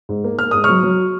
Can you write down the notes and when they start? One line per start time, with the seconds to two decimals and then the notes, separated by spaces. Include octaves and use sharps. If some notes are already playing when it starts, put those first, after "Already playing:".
0.09 G#2
0.24 A#3
0.38 A#3 F6
0.51 G#2 D#6
0.64 F#3 C#6 F6
0.83 F#3